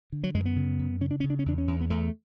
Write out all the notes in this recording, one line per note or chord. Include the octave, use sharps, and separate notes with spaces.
D3
F#3
F#2 G#3
B3
C#3
F#2
C#3 C#4
D4
C#3 C#4
D4
C#4
E2 D4
C#4
E2
B3
E2 A3